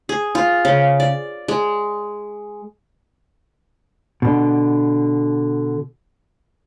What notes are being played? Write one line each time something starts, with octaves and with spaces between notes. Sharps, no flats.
G#4
F4
C#3
D5
G#3
B2 D3